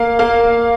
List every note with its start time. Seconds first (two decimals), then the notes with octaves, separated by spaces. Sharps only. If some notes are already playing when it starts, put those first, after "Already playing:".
Already playing: A#3 F5
0.19 A#3 F5